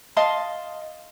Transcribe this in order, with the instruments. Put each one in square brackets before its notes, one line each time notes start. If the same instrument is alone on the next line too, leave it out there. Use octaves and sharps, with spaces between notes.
[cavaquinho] D#5 F5 A5 C6